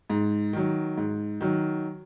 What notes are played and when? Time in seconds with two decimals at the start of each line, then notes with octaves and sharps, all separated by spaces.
0.10 G#2
0.53 D#3 F#3
0.97 G#2
1.41 D#3 F#3